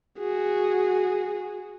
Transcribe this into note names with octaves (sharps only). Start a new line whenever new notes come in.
F#4 G#4